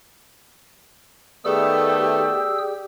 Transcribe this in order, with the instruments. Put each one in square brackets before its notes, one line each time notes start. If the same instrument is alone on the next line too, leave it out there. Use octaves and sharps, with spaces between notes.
[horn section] D#3 A3 B3 [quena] G4 [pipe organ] G#4 E6 [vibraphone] D5